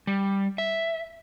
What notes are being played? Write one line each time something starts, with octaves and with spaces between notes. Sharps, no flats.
G3
E5